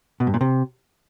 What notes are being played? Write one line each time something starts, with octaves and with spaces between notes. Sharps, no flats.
B2
G2
A#2
C3